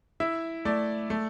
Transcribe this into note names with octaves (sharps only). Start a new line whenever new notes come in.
E4 E5
A3 D5
A3